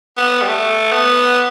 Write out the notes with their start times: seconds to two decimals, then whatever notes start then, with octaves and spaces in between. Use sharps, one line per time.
0.17 B3
0.42 G3
0.48 A3
0.92 B3